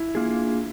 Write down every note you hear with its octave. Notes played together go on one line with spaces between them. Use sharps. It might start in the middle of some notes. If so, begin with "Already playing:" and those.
Already playing: E4
A#3 D4 F4 G#4